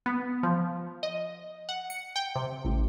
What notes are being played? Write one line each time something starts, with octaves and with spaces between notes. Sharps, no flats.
B3
F3
D#5
F#5
C#7
G5
C3
A1